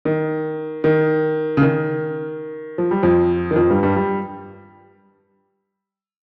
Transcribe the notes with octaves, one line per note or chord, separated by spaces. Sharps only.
D#3
D#3
C#3
D#3
F3
G3
F2 F3
D#3
F2 F3
G2 G3
G2 G3
G3